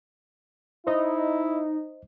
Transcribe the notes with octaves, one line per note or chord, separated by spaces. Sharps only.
D#4 E4 C5 D#5